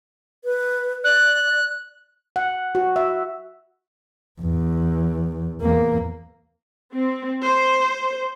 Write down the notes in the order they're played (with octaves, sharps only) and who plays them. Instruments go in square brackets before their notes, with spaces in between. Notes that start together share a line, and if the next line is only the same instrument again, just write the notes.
[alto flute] B4
[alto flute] D5 [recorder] F#6
[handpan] F#5
F#4
E5
[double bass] E2
E2 A#3
[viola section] C4
C5